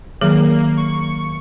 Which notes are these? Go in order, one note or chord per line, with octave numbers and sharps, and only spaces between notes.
D#3 F#3 A#3 G#4
C#6